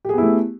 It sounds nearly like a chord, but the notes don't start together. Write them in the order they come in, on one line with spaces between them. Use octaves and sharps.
G4 G#4 B3 E4 A3